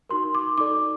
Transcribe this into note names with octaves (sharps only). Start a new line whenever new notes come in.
D#4 F#4 A#4 C6
D6
D#4 A4 D5 D6